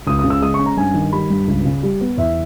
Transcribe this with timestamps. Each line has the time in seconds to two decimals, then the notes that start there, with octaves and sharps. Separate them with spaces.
0.07 C#2 D#6
0.19 D#6
0.24 C#3
0.30 E6
0.41 G#3 D#6
0.54 C#6
0.59 C#4
0.66 A#5
0.77 G2 G#5
0.94 D#3
1.13 G3 B5
1.30 G2
1.48 C#2
1.65 C#3
1.83 G3
2.01 B3
2.17 E2 E5